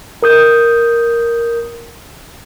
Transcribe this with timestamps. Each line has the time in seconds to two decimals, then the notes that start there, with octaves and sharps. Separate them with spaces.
0.23 A#4 D#6 G6